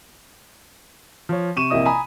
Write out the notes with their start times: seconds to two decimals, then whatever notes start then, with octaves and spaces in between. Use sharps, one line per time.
1.29 F3 C#5
1.56 C3 C#6 D#7 E7
1.70 A#1 C3 A#3 E4 D#5 D#6
1.86 G#5 A#5 B5 D#6